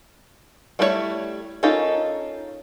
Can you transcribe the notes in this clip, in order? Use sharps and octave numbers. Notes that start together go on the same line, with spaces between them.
G3 A3 E4 F4 C#5
C#4 D#4 F4 A4 A#4